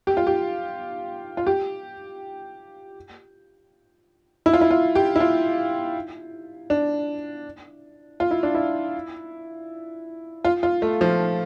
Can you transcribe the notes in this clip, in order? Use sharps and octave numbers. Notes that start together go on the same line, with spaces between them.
G4
F4
G4
F4
G4
E4
F4
E4
F4
G4
E4
F4
D4
F4
E4
D4
E4
F4
F4
A3
F3